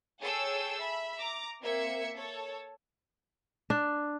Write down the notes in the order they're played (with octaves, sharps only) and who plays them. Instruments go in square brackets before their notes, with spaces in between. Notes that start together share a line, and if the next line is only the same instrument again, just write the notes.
[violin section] G#4 A4 C#5 G5 E6
E5 B5
A#5 D6
A#3 C4 E5 G#6 C#7
A4 C#5
[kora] D4